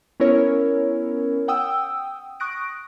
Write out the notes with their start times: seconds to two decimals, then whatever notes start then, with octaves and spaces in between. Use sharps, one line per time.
0.20 B3 C#4 E4 A#4 C#5
1.48 F#5 G5 D#6 E6
2.40 C#6 D#6 F#6 A#6 D7